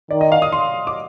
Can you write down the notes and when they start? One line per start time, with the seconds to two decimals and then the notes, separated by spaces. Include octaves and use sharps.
0.11 D#3 D5
0.21 D#5
0.32 F5
0.42 D#6
0.52 C6
0.87 D6